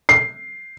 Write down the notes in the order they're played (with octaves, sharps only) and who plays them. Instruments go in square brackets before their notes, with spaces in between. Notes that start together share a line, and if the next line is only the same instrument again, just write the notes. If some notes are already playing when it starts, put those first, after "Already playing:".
[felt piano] C7